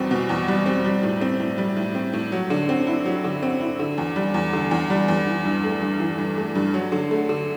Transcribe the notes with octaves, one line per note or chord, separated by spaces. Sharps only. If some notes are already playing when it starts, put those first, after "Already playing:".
Already playing: E2 B2 G3 C4
B2
E2
G3
C4
G3
A2
C4
A2
G3
A2
C4
A2
F#3
D3
C4
E4
F#3
D3
C4
E4
D3
E2
G3
E2
D3
E2
G3
E2
E3
G2
A3
G2
E3
G2
A3
G2
F#3
D3
A3
D3